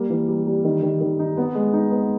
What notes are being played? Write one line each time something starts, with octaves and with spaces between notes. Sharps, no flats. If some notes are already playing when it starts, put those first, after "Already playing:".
Already playing: G3 A#3
E3
G3
G3
D#3
D#3
D#3
D#4
B3
G#3
D#4
B3